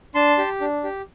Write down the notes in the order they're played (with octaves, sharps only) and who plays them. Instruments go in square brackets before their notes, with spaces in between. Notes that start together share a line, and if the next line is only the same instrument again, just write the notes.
[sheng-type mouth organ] D4 A5 C6
G4
D4
G4